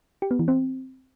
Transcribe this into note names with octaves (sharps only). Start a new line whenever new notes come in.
G4
B3
E3
C4